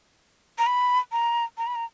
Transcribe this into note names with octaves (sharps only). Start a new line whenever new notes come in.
A#5
B5
A#5
A#5
B5
A#5